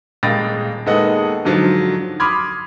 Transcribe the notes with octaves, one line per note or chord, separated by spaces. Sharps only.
D#1 G#3 F5 G5 A6 A#6
D#2 G#3 B3 A4 D#5 F#5
G#2 D3 F3 F#3
B5 C6 D6 D#6 F6 G#6